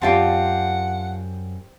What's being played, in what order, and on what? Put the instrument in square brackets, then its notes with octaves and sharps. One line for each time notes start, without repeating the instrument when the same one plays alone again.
[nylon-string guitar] F#2 [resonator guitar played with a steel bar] C4 G4 D5 [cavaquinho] F4 A5 C6 [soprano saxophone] F#5